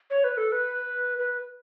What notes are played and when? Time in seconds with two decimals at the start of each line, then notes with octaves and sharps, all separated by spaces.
0.10 C#5
0.24 B4
0.37 A4
0.52 B4
1.18 B4